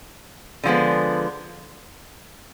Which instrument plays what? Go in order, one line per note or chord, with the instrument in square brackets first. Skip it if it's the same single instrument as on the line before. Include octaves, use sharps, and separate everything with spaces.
[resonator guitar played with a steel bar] D3 F3 G#3 B3